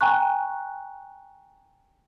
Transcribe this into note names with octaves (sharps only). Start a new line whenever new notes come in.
G5 G#5 A#5 C#6 F#6